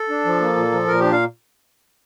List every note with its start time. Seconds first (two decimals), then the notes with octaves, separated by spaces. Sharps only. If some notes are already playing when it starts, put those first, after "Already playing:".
Already playing: A4
0.09 D4
0.25 F3
0.40 A#3
0.56 A#2
0.72 F3
0.87 A#2 A#4
1.00 D4 G4
1.12 F5